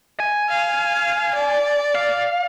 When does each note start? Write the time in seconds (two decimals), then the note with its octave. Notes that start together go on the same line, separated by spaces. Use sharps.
0.20 G#5
0.49 F5
1.35 D5
1.95 F5